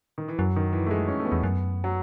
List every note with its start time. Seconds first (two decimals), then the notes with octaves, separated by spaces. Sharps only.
0.18 D#3
0.28 E3
0.38 F#2 F#3
0.56 D#3
0.73 E3
0.86 A3
0.91 G#3
1.08 C#4
1.20 A3
1.26 B3
1.32 E2
1.44 F#2
1.84 F#3